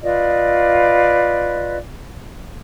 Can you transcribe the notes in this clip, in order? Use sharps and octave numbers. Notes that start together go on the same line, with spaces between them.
F4 B4 D5 D#5